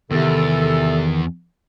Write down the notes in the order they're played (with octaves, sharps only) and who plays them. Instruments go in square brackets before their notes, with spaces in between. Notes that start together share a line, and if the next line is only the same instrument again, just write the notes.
[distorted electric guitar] E2 [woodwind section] C3 A4 [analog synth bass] D#3